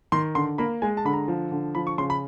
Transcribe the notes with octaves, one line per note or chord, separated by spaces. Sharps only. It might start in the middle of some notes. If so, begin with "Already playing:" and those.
D#3 C6
D3 C6
A#3 B5
G#3 G#5
A5
D3 B5
A#5
F3
D3
F3 B5
C#6
C#3 C6
B5